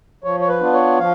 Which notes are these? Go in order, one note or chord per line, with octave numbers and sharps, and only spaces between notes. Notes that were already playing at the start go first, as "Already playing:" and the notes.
F3 C#5
C#5
B4
B3 D4 F4
C#5
F3 F5